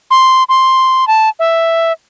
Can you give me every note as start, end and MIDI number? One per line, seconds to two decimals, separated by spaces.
0.11 0.43 84
0.49 1.07 84
1.08 1.29 81
1.39 1.92 76